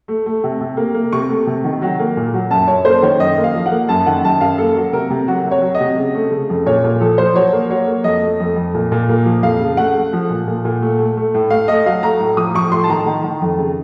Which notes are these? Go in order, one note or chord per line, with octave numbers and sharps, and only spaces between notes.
A3
A3
C3
C3
A#3
A#3
C3 C#6
A3
C3
D#3
F#3
A#3
A#2
F#3
F#2 A5
F#2 C#5
A#3 C5
D#3 C#5
F#2 D#5
A#3
F5
F3
F#5
A#3
F#2 A5
D#3 F#5
F#2 A5
F#2 F5
A#3 A4
F#3
C3 A#4
C3
F#3 F#4
C3
C#5
F#3
D#5
C3
C#3
A3
C#3
F2
A#2 C#5
A#2
F3 A4
F3 C5
F#3 C#5
A#3
F#3 C#5
A#3
F2 D#5
A3
F2
F2
A#2
A#2
A#3
F3
F2 F5
C#3
A3 F#5
A3
F3
A#2
A#2
A#2
A3
A3
A3
A2
A3 F5
A3 D#5
F#3 F5
A3 A#5
A2
F3 D#6
F3 C#6
A2 C6
A5
D#3 A#5
D#3
D#3
F2
C#3